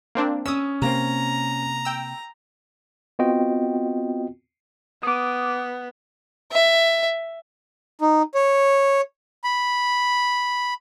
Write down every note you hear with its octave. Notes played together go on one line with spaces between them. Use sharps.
A#3 C4 D4
C#4 D#6 E6
C3 A#3 C4 A#5
G5 E6
B3 C4 F4 F#4 D#5 G5
B3 D6 D#6
E5
D#4
C#5
B5